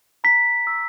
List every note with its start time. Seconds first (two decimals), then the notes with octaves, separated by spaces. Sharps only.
0.24 A#5 B6
0.67 E6